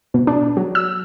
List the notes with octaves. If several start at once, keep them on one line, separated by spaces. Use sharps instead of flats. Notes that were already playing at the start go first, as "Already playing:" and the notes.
B2
D4
F#3
E6